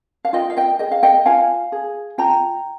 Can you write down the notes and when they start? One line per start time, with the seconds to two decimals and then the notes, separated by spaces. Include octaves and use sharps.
0.25 F5
0.33 F4 D#5 G5
0.50 F5
0.57 D#5 G5
0.79 G#4 D#5 G5
0.92 F5
1.03 D#5 G5
1.26 F4 F5 G#5
1.72 G#4
2.18 F4 G5 A#5